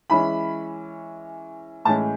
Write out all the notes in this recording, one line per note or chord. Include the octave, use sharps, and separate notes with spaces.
E3 G#3 C#4 B5
A2 E3 G#3 C#4 A5